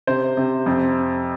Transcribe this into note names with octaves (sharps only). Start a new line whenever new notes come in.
C3 C5
C3
F2